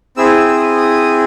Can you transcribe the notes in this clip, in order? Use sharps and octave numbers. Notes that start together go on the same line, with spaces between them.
C4 E4 G#4 E6
E6
E6
D#6
D#6